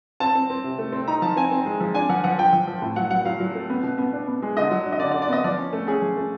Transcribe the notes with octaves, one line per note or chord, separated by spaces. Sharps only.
C4 A5
C4
C4
C3
A3
C4
D#4 A#5
F3 A5
C4 G#5
C4
G#3
F3
D4 G#5
F3 F#5
F3 F#5
F3 G5
F3
F3
A2
F#3 F#5
F#3 F#5
F#3 F5
F#3
A3
B3
B2
B3
D4
B3
G#3
D3 D#5
F#3
D4
D#5
D3 D5
D5
D3
D5
B3 D#5
F3 D5
C#4
A3
C#4 G#4
F3
A3